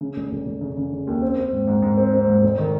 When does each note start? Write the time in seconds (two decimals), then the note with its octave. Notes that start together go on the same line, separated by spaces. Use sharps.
0.01 C#3
0.16 F1
0.31 F1
0.46 F1
0.61 C#3
0.77 C#3
0.92 C#3
1.07 D#2
1.22 C4
1.37 C4
1.52 G#2
1.67 G#2
1.82 G#2
1.97 C4
2.13 C4
2.27 G#2
2.43 F1
2.58 D#3